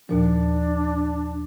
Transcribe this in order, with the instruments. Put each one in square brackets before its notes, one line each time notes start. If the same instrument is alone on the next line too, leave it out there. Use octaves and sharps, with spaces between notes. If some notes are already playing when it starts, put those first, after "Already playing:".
[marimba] D#2 A#2 F3 [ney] D4